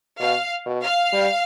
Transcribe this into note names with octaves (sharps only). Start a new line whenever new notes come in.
B2 F5
B2
F5
G3